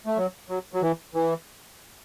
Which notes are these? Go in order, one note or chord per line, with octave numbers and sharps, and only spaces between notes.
A3
F#3
F#3
F#3
E3
E3